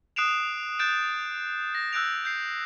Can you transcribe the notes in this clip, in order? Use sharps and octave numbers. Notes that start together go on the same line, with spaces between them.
D#6 F#6 C7 D7 E7 F7
F#6 G6 A6 D7 E7
A#6
E6 F#6 G6 D7 F7
G6 C7